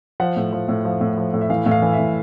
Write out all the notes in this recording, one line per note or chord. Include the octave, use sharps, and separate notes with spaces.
F3 F#5
A2
F3
A2
F3
A2
F3
A2
E5
E3 F5
A2
F5
E3
E5
A2